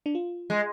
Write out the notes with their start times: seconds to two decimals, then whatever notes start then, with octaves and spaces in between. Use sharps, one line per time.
0.06 D4
0.15 F4
0.50 G#3